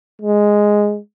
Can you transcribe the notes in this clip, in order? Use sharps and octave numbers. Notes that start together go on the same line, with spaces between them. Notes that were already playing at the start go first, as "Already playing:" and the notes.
G#3